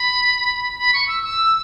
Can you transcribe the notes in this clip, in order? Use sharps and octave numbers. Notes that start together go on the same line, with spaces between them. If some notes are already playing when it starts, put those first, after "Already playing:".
Already playing: B5
B5
C#6
E6
E6